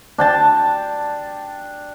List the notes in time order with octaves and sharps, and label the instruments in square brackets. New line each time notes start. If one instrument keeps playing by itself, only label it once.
[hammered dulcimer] D4 G5 A5